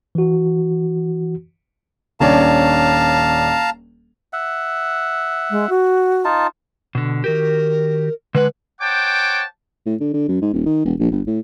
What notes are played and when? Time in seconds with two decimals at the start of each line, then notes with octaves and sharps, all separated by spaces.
0.15 E3 F#4
2.20 D#1 C#4 D4 F5 A5 A#5
4.33 E5 F#5
5.50 G#3
5.69 F#4
6.25 D#4 F4 A5
6.95 B2 D3
7.24 D#3 F#4 G4 A#4
8.35 D3 G#3 B4 F#5
8.81 C5 C#5 F#5 G5 A5 D6
9.86 A2
10.01 D3
10.14 D3
10.28 F#2
10.42 G#2
10.53 D#1
10.66 D#3
10.85 E1
10.99 A#1
11.12 G1
11.27 A2